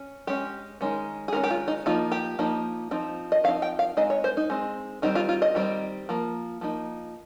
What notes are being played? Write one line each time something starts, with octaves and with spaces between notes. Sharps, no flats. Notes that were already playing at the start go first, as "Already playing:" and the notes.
Already playing: C#4
G#3 C#4 G4
D#3 G#3 C#4
G#4
D#3 G#3 C#4 A#4
G4
F4
D#4
F3 A#3 D#4 F4
G4
F3 A#3 D#4
F3 C4 D#4
D#5
F3 C4 D#4 F5
G5
F5
G#3 C4 D#4 D#5
C#5
C5
D#4
G#3 C4 D#4
D#3 G3 C4 D#4
F4
F4
D#5
D#3 G3 C4
F3 A#3
F3 A#3 D#4